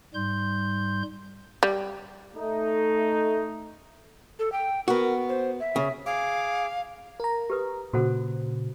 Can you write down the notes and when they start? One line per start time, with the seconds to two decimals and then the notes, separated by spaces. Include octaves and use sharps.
0.14 G#2 G3 C6 G6
1.63 G3
2.36 A3 D#4
4.39 A4
4.52 G5
4.88 B3 F#4 A#4
5.29 C5
5.60 E5
5.76 C#3
6.06 G#4 F5 D6
7.20 A#4 A#5
7.50 G4 B4 D#6
7.93 A#2 C#3 F#4 C5 F#5